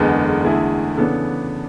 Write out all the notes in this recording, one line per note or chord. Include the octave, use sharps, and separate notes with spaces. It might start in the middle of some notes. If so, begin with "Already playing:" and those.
Already playing: F#1 E2 D3 G#3 B3
E2 D3 A3 E4 G#4
C#3 E3 B3 D4 A4